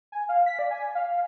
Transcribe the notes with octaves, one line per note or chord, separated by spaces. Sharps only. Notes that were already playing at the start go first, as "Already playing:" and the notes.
G#5
F5
B6
D5
G#5
F5